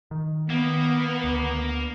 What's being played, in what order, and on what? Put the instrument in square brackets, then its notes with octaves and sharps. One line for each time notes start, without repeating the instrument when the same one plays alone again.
[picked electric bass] D#3
[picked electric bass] D#3 [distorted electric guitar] A#3 [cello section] B3
[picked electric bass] D2